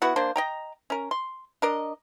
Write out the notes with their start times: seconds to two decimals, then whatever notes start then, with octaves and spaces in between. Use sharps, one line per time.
0.02 B3 E4 F#4 F#5
0.16 A#3 D4 C5
0.36 D#5 G5 A#5
0.90 C#4 A#4
1.11 C6
1.62 D4 A#4 D#5